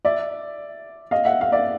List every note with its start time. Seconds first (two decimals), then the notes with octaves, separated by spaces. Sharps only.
0.05 D5 E5
1.11 D#5 F5
1.25 E5 F#5
1.41 F5
1.52 D5 E5